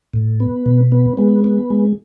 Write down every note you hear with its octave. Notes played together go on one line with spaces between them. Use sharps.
A2
B3
B2
B3
G#3 B3
B3
G#3